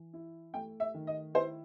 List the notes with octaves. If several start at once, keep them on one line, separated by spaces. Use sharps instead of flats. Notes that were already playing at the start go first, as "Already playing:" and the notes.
Already playing: E3
E4
A3 G5
E5
D#3
D#5
E4 C5